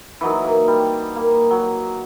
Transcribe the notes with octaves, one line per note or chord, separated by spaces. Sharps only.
E3 F#3 D#4
A#3
G3
A#3
F#3